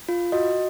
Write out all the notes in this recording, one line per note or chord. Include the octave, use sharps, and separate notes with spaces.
F4
F#4 D#5